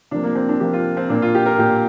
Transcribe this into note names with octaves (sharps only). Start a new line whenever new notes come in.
C3 F3 A#3 D4
A#3
C4
D4
C3 F3 A#3 G4
F4
C4
A#2 A#3 D4
F4
G4
A#4
A#2 A#3 G4